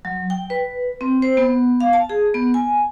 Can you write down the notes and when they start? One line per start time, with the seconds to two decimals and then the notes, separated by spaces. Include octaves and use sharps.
0.05 F#3
0.30 G5
0.50 B4
1.01 C4
1.22 C5
1.37 B3
1.81 F5
1.93 A5
2.09 G#4
2.34 B3
2.54 G#5